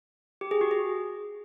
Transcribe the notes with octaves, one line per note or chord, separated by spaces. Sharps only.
G4
G#4
F#4
G#4